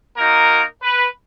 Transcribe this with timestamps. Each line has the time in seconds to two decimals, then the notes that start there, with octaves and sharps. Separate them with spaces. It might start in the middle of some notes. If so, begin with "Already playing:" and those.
0.16 A#3 D#4 F#4 A#4
0.82 B4